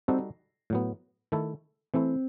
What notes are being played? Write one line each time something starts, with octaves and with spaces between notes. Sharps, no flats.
G3 C4 D#4 F#4 A4
A2 F#3 B3
D#3 A3 E4 A4
E3 A3 C4 E4